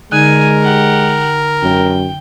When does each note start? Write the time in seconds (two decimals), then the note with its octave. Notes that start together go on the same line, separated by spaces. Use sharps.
0.12 D3 G#3 D#4 A#4 G#5
0.62 G4 F#5
1.63 F#2 G5